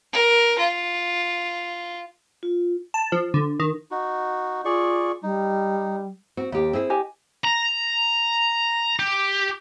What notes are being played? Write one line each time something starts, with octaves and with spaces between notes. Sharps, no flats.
A#4
F4
F4
A5
F3
D3
D#3
D#4 F#4
F4 G#4 D5 C#6
G3 D#4
C4 F#4
D#2 G4
C4 E4 G#4
G4 D#5 G#5
A#5
G4